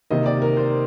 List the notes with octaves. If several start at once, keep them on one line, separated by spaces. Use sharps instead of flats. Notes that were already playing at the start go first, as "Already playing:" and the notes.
C3 D#3 A#3 D#5
D5
A#4
C5